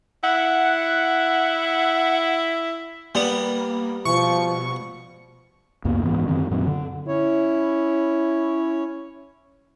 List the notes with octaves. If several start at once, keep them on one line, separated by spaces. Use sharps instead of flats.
E4 F#5
G3 A#3 B3
B2 F3 C#6
C#2 F#2 A#3 B3
G#2 E3 A3 B3
F#2 D3 D#3 C4
F#2 A#2 F#3 C4
D3
C#4 E4 C#5